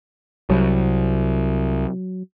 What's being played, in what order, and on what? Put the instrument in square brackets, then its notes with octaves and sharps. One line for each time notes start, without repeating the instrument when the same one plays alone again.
[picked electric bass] C2 [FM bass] F#3